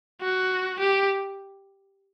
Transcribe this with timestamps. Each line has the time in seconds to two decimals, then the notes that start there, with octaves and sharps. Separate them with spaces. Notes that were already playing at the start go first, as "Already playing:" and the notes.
0.22 F#4
0.80 G4